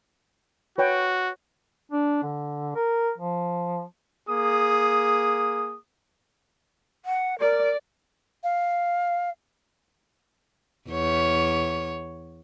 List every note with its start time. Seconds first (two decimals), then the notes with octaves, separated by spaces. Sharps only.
0.78 F#4 B4 C#5 G5
1.91 D4
2.23 D3
2.75 A#4
3.18 F3
4.28 A#3 G#4 D#6
7.05 F#5
7.40 A#4 D5
8.42 F5
10.90 E2 C#5